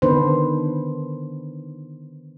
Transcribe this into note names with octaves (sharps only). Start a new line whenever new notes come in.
D3 D#3 B3 D4 B4 C5